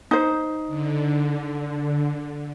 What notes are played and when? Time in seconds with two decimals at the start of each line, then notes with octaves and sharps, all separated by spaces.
0.11 D#4 C5
0.67 D3